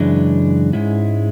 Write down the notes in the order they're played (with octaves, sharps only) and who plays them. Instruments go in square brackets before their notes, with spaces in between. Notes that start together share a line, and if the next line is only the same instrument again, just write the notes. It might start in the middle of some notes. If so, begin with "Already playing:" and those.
Already playing: [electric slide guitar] F#2 C#3 E3 G#3 D4
G#2 G#3 C#4 E4